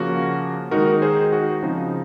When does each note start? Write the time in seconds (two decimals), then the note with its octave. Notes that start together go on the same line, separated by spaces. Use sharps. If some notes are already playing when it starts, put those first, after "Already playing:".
Already playing: C#3 F3 A#3 C#4 F#4
0.71 D#3 G#3 D#4 F#4 A#4
1.02 G#4 C5
1.32 F#4
1.62 C#3 F3 C4 D#4